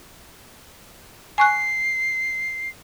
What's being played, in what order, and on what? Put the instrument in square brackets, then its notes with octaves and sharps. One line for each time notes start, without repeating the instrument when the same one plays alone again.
[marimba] G#5 C#6 F#6 [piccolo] C7